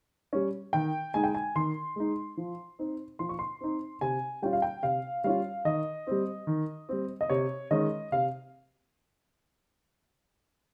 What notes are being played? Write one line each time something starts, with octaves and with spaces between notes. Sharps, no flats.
G3 C#4
D#3 G5
G#3 D#4 G#5
G5
G#5
D#3 C6
G#3 D#4
F3
C4 D#4
F3 C6
C#6
C6
C4 D#4
C3 G#5
G3 C#4 F4 G5
F5
G5
C3 F5
G3 C#4 F4 F5
D#3 D#5
G3 C4
D#3
G3 C4
D#5
C3 C#5
D#3 G#3 C#4 D#5
C3 F5